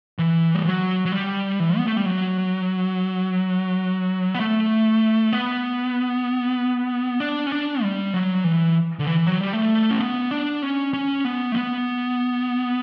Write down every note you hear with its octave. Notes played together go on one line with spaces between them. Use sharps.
E3
G3
F#3
F#3
G3
E3
B3
A3
G3
F#3
B3
A3
B3
D4
C#4
D4
G3
F#3
E3
D3
E3
F#3
G3
A3
C#4
B3
D4
C#4
C#4
B3
A3
B3